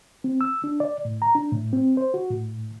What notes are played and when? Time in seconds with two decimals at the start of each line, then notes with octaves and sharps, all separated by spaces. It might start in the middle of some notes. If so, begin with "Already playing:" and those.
0.24 C4
0.41 E6
0.64 D4
0.80 D5
1.05 A2
1.22 A#5
1.35 D4
1.52 A2
1.73 C4
1.97 C5
2.14 F#4
2.31 A2